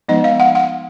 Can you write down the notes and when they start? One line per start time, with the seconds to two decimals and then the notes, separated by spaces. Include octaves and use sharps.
0.09 F3 G#3 B3 D#4 D#5
0.24 F5
0.40 F#5
0.55 F#5